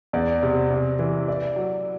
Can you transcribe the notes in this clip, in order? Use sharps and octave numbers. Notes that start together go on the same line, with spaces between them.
E2 D5
C3
C3
E3
E4 D5
F#3